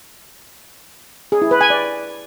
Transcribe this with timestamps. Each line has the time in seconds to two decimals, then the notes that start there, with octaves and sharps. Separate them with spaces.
1.32 G#4
1.42 E4
1.51 B4
1.61 G#5
1.70 D5